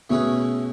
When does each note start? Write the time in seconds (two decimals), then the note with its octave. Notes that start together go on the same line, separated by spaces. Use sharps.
0.10 B2 A3 C#4 G#4 B4